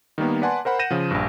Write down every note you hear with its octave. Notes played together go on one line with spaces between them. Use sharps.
D#3 G3 A#3 B3
B4 D5 F#5 G#5 A5 C6
A#4 C5 F#5 B5
F#5 G6 A#6 D#7 E7
C#3 F3
A#1 G2